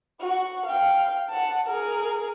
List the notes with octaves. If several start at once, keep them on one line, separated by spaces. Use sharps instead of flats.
F#4
F5 G5
F#5 A5
G#4 A#4